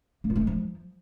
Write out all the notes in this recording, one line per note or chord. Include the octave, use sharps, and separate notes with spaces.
A#3
F4
A3
G#3
F3